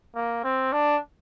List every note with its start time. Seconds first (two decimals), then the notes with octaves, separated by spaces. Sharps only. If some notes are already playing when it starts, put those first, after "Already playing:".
0.15 A#3
0.44 C4
0.72 D4